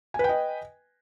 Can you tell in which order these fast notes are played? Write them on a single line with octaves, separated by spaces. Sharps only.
G#5 B4 G5 D#5